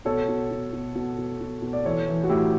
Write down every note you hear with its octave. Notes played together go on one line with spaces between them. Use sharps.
B2 A4 C#5
B2
B2
B2
B2
B2
B2
B2
D5
E3 A4 C#5
E3
F#4
A2 E4 G4